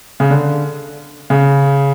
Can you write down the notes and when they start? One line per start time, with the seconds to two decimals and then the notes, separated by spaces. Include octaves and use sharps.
0.20 C#3
0.30 D3
1.30 C#3